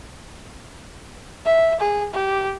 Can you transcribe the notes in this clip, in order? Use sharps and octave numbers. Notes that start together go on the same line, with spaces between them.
E5
G#4
G4